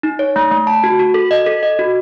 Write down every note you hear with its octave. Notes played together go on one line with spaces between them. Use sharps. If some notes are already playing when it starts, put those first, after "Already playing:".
D#4
C#5
A3
A3
A5
F#4
F#4
A4
D#5
A4
D#5
F#4